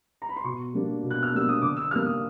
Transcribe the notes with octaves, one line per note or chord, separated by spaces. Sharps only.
A#5
B5
C6
B2 C#6
G3 A#3 D4
B2
F#6
F6
G3 A#3 D4 E6
D#6
D3 D6
E6
G3 A#3 F6
D#6